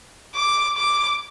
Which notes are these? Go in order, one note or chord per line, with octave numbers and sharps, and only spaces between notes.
D6
D6